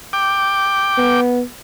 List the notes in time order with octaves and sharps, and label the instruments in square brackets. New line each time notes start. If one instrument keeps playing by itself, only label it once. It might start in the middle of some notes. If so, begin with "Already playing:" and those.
[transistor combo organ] G5 D6
[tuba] B3